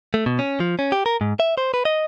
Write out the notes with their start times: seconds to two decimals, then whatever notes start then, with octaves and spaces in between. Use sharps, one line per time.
0.14 A3
0.26 B2
0.39 C#4
0.60 F3
0.79 C#4
0.92 G4
1.06 A#4
1.21 G#2
1.40 E5
1.58 C5
1.74 B4
1.85 D#5